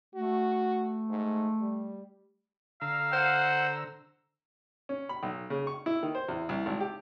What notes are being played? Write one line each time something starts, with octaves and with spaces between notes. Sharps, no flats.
A3 F#4
G#2
G3
D3 F5 A#5 E6
C5 F#5
C#4
B5
B1
C#3
C#6
E4
D#3
C5
E2
C2
G#1
G4